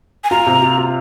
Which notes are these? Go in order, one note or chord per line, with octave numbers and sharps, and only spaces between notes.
G#5
F4 A#5
C3
F4
F4